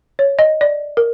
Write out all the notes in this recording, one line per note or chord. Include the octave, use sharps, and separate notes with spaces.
C#5
D#5
D5
A#4